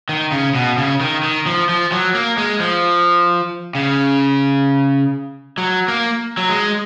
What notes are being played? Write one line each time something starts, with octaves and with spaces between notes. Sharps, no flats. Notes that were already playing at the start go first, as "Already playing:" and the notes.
D#3
C#3
B2
C#3
D#3
D#3
F3
F3
F#3
A#3
G#3
F3
C#3
F#3
A#3
F#3
G#3